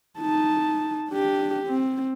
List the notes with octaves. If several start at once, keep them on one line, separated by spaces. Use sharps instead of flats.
D#4 A5
D4 G4
C4